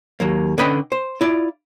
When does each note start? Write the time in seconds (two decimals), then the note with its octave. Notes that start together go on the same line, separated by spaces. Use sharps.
0.20 D#2 F#3 A#3
0.58 D3 C#4 B4 D#5 G5 B5
0.92 C5
1.21 E4 F4 D5